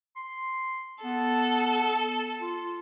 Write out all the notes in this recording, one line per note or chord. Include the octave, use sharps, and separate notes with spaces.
C6
B3 A4
F4